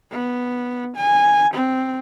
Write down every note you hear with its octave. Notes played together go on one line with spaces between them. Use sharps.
B3
G#5
C4